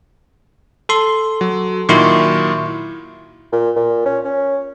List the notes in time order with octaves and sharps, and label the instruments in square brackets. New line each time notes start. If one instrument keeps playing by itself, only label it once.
[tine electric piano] A4 C6
[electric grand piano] F#3
[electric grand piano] A#2 D#3 F#3 [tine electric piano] E4 C6 C#6
[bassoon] A#2
A#2
C#4
C#4